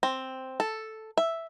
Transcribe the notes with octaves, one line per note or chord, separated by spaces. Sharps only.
C4
A4
E5